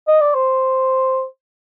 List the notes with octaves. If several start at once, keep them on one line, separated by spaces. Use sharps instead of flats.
D#5
D5
C5